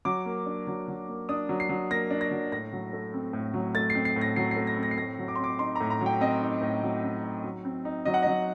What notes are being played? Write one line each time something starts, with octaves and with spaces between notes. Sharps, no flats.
F#3 D6
A#3
D4
F#3
F#3
A#3
D4 D#6
F#3
C7
F#3
A#3 A#6
D4
A#6
F#3
A2 A#6
F#3
A3
C4
A2
F#3
A3 A6
C7
C4
C7
A2
A#6
F#3 C7
C7
A3
A#6
C4
A#6
C7
A2 A#6
F#3
D6
C6
C4 D6
D#4 C6
A#5
A2
A#5
F#3
G5
C4 D#5
D#4
A2
F#3
C4
D#4
F#3
C4
D#4
F#3 D#5
F#5
F#3 D#5